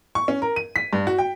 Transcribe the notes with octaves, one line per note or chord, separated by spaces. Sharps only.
C#6
C#4
A#4
D#7
B6
G2
F#4
G5